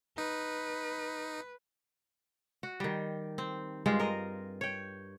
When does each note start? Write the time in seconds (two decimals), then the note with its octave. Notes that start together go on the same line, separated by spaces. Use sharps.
0.18 D#4 B4
2.63 F#4
2.80 D#3 G3
3.38 C4
3.86 G2 G#3 C4 F4
4.00 A#4 D#5
4.61 C#5 G5